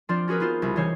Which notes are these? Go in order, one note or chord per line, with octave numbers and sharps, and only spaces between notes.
F3 C4 D4 F4 C5 D5
C#4 F#4 G#4 A#4 B4
B3 D#4 F4 C5
C2 C#3
E3 D#4 C5 C#5 C7